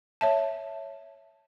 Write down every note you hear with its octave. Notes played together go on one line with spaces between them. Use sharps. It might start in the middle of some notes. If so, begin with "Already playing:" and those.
C#5 E5 A5